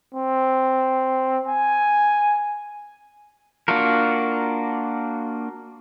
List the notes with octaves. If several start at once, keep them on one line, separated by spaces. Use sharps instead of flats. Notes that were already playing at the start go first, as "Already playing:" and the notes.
C4
G#5
A#3 D4 F4 F#4 A#4